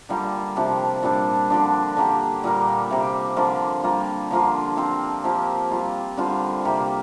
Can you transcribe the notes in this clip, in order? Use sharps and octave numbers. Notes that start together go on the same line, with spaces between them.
D3 G3 A#3 F4
C3 F3 D4 G4
A#2 G3 D4
D3 F3 D4
D3 A#3 G4
A#2 G3 A#3
C3 A#3 G4
D3 F3 A#3 F4
G3 A#3 F4
D3 F3 A#3 F4
F3 C4 F4
F3 A#3 G4
G3 A#3 F4
D3 G3 C4 F4
C3 A#3 G4